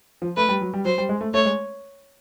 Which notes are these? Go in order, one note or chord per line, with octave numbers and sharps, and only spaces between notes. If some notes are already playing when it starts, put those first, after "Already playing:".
F3
A3 B4
G3
F#3
G3
F#3 C5
G3
G#3
A3
A3 C#5
G#3